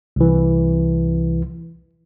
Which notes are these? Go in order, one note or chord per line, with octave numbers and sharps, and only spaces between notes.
C2 E3